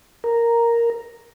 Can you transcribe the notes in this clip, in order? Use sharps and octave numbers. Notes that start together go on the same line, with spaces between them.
A#4